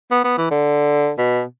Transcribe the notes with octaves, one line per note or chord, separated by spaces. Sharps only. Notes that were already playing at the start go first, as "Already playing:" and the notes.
B3
B3
E3
D3
B2